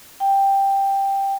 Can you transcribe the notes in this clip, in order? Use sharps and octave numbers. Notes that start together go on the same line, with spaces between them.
G5